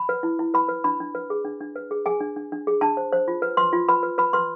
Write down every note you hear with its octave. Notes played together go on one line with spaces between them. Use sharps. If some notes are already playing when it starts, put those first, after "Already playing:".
Already playing: B5
B4
E4
E4
B4 B5
B4
D4 B5
D4
B4
G#4
D4
D4
B4
G#4
G#4 G#5
D4
D4
D4
G#4
D4 A5
C5
C5
F4
B4
B4 C6
F4
B4 B5
B4
B4 B5
B4 C6